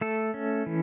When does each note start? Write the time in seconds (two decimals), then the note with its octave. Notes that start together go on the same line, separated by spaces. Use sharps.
0.01 A3 A4
0.34 C#4
0.66 E3